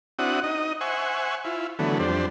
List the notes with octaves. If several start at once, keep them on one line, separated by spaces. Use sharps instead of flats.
C4 D4 E4 F#4 F#5 D#6
D#4 D#5
C5 E5 F#5 G#5 C#6
E4 F4
D3 E3 F#3 A3 B3
F2 G3 D4 C5